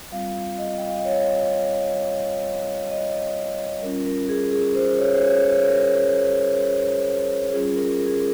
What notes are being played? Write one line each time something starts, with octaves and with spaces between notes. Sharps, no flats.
G3 C4 F4 F5
D#5
G5
F5
D#5
C#5
D#5
G3 C#4 F4 A#4
A#4
G#4
G#4
C5
C#5
C5
C#5
C#5
A#4
G3 C#4 F4 G#4
A#4
A#4
G#4
A#4